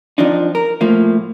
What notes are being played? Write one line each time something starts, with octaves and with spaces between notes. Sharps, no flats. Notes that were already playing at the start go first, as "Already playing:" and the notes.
F2 F3 D4 D#4
A#4
A2 F3 A#3